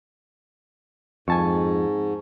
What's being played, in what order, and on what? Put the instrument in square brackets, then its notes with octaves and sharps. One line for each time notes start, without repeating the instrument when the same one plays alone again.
[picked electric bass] F2 [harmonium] G#2 [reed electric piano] G#5 A5 C#6